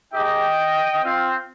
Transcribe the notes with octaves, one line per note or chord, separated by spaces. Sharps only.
G#3 D#4 G4 D#5 G5
C4 F4